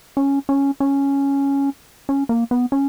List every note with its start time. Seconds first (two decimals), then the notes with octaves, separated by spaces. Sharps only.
0.17 C#4
0.49 C#4
0.80 C#4
2.09 C#4
2.29 A#3
2.51 B3
2.72 C#4